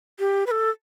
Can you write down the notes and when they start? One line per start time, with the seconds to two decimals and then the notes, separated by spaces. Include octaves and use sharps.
0.19 G4
0.47 B4
0.51 A4